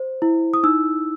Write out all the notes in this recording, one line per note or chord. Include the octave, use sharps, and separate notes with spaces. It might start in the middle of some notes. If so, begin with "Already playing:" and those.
Already playing: C5
E4
D#6
D#4 E6